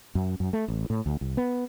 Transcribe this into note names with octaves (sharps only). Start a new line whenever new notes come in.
F#2
F#2
A3
A1
A2
D2
C2
B3